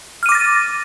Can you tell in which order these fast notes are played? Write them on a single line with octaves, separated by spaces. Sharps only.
F6 D#7 D6 A#6 A6